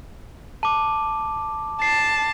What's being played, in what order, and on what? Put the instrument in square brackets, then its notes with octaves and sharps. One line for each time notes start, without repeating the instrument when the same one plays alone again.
[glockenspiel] A5 D6
[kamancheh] A5 [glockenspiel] C7